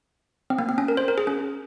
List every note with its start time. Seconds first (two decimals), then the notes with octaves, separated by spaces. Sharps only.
0.50 C4
0.59 A#3
0.69 C4
0.78 C#4
0.88 A#4
0.97 C5
1.08 A#4
1.18 G#4
1.27 C#4